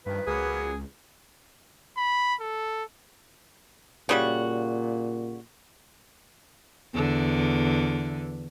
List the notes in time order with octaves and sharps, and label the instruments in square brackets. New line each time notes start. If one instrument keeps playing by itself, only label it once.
[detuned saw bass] G2 [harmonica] D#3 F3 [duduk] B4
[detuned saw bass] C#2 [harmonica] F#3 A#3 B3 [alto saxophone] G#4
[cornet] B5
A4
[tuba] A#2 [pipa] C#3 G3 F#4
[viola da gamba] E2 D3